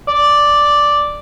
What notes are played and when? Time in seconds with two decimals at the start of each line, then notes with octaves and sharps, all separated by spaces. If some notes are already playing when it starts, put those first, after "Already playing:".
0.08 D5